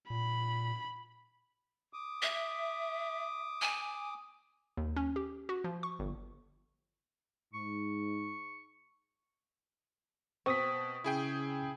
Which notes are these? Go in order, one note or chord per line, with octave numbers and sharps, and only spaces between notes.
A#2 B5
D6 D#6
E5
G#5
D#2
C#4
G4
F#4
F3
C#6
G1
G#2 C#6
B2 C4 C#6 D#6 B6
C#3 E4 G#4 G5